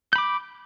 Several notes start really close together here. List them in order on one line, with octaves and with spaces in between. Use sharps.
G6 B5 D6